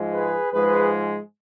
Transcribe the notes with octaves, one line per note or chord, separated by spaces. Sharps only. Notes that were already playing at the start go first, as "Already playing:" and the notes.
Already playing: G#2 F3 G#3
G#4 B4
G#2 F3 G#3 G#4 B4